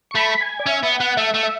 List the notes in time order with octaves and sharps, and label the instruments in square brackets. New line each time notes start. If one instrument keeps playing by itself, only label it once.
[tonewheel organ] C#6
[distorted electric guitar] A3 [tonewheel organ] B5
[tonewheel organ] G#5
D5
[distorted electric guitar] C#4 [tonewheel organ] E5
[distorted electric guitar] B3
[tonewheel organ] F#5
[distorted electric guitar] B3
[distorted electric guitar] A3 [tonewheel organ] E5
[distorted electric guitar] A3
[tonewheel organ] E5